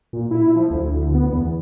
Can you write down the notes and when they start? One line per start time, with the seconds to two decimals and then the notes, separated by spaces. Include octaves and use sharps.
0.13 A#2
0.31 E4
0.56 F3
0.71 D2
1.15 B3
1.32 E2